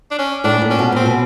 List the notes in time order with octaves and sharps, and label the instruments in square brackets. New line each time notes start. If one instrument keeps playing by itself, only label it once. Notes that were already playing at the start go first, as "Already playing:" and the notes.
[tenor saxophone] D4
C#4
[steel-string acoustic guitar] A2 [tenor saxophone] D4
[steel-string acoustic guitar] A#2
[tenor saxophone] C#4
[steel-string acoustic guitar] B2
[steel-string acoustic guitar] A#2 [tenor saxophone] C4
[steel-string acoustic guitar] B2